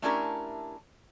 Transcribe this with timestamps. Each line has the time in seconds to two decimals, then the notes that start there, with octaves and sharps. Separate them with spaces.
0.02 A3 C#4 D4 E4 G4 A#4